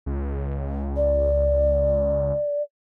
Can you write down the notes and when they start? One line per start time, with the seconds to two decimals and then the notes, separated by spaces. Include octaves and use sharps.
0.06 C#2
0.96 D5